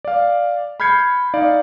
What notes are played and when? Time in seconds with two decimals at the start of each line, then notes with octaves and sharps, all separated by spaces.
0.05 D5 F5
0.80 B5 F6 G6 G#6 C7 C#7
1.34 D#4 D5 F5